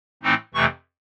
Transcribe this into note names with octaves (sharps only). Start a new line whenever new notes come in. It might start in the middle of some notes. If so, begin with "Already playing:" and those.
A2 E3 A3 C4 D#4
F2 C3 E3 A3 C#6